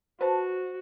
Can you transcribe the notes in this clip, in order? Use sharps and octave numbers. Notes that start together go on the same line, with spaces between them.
F#4 B4 C5 A5